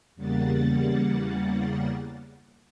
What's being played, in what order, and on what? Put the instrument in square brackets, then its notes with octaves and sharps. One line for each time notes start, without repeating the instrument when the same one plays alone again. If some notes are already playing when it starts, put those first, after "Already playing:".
[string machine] E2 C#3 G3 A#3 F#5 A6